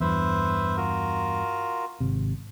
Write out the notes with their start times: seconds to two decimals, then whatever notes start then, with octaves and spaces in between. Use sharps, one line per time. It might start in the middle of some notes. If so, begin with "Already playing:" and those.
0.01 E2 G2 B4 C5 E5
0.77 F4 F#4 A#4
2.01 G#1 C3